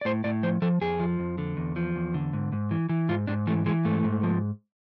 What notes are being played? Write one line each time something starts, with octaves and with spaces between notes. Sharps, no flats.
D5
A2 C5
A2 D5
F3 C5
F3 A4
F2 G#4
F3
F2
D3
E2
F3
E2
D3
G#2
G#2
E3
E3
G#2 F4
G#2 D4
E3 A3
E3 G#3
G#2 A3
G#2
F3